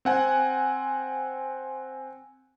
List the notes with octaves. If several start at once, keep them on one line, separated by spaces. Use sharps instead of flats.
C4 F#5 G#5